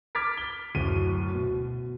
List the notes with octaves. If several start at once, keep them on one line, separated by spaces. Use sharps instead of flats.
D6 F6 G#6 A6 B6 D7
G7
D1 F#2 D#7
B2